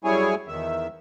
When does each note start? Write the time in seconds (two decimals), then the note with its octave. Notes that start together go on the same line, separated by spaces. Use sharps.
0.04 F#2 G3 E4 G#4 C#5 G#5
0.48 E2 D#3 E5